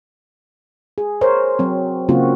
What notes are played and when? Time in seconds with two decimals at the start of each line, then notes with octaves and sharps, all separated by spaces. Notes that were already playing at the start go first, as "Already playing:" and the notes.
0.98 G#4
1.21 A#4 C5 C#5
1.59 F#3 C4
2.09 C#3 F#3 A#3 C4 F4 F#4